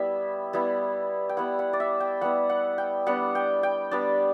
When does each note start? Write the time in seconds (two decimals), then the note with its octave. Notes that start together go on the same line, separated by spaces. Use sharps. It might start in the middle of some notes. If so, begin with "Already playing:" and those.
Already playing: G3 B3 E4 E5
0.53 G3 B3 E4
1.29 G5
1.37 G3 B3 E4 F#5
1.59 F#5
1.73 D5
1.80 E5
2.00 G5
2.21 G3 B3 E4 F#5
2.50 F#5
2.78 G5
3.06 G3 B3 D4 F#5
3.35 G5
3.63 G5
3.91 G3 B3 D4 D5